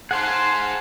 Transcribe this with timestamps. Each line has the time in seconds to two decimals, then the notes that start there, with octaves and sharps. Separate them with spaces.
0.11 G#4 C5 F5 F#5 A5 C6